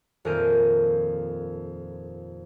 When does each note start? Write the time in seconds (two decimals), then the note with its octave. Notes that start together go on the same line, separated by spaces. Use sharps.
0.25 D#1 F2 A#4 G#5 G6 D#7